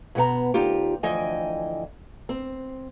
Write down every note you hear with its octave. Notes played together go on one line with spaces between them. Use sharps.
B2 B3 F#5 A#5
D2 D#4 F4 G4
D2 E3 F3 D#5 G5 G#5
C4